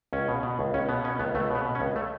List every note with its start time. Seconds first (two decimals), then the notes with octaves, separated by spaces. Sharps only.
0.13 C#2 C#4
0.28 B2
0.43 B2
0.59 C#2
0.74 C#2 C#4
0.89 B2 B3
1.04 B2 C#4
1.19 C#2 B3
1.35 C#2 A3
1.50 B2
1.55 B3
1.65 B2
1.75 C#4
1.80 C#2
1.96 A3